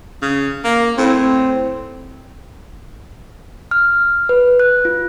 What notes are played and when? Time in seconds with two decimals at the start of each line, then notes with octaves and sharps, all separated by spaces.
0.22 C#3
0.64 A#3
0.98 A2 C4
3.71 F6
4.29 B4
4.60 F#6
4.85 F4